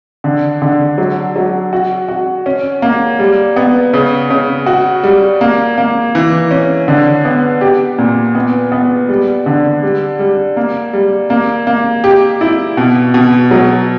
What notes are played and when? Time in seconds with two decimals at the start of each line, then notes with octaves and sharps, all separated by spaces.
0.24 D3
0.62 D3
0.98 F#3
1.36 F#3
1.73 F#4
2.08 F#4
2.46 C#4
2.82 A#3
3.19 G3
3.56 B3
3.93 C#3
4.30 C#3
4.66 F#4
5.04 G3
5.41 A#3
5.78 A#3
6.15 E3
6.51 C#4
6.88 D3
7.25 B3
7.61 G4
7.98 A#2
8.35 B3
8.72 B3
9.09 G3
9.46 D3
9.82 G3
10.19 G3
10.57 A#3
10.93 G3
11.30 A#3
11.67 A#3
12.04 G4
12.41 E4
12.77 B2
13.14 B2
13.51 F#3